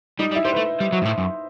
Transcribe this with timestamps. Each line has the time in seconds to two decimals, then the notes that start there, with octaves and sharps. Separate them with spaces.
0.19 G3 D#4
0.31 G3
0.36 E4
0.44 G3 C5
0.52 A3 B4
0.80 G3
0.93 F#3
1.02 G2
1.05 A2
1.18 F#2